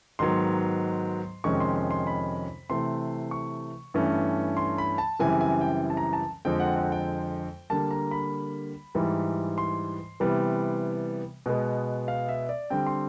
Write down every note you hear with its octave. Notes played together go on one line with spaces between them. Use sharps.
G#2 D#3 F#3 B3 C6
F2 C3 D#3 G#3 C#4 C#6
C6
C6
C6
B5
C3 E3 A3 C6
C#6
G2 E3 A3 C#4
C6
B5
A5
F#2 C#3 E3 G3 C4 G#5
G#5
G5
A5
A#5
A5
F2 D3 F3 G#3 C4 G5
F#5
F#5
G5
D3 G3 A#3 A5
A#5
B5
G#2 E3 G3
C6
C3 E3 G3 B3
B2 G#3 B3
F5
E5
D5
D3 G3 C4 G5
C6